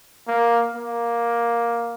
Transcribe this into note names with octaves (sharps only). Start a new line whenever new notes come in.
A#3
A#3